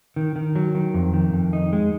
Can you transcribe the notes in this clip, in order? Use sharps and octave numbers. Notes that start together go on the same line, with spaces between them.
D#3
D#3
F#3
D#3
F2
D#3
F2
D#4
G#3